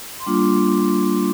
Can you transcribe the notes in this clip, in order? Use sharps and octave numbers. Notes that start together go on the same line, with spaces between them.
C6
G3 A#3 D4 F4 D6